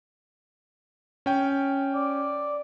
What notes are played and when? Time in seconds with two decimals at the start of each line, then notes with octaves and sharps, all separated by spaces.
1.26 C#4 G5
1.95 D5